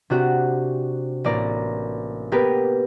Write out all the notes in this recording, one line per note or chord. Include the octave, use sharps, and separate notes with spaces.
C3 D4 F#4 G4
A1 A#3 D5 A#5 A#6
A#3 B3 G4 A#4 B4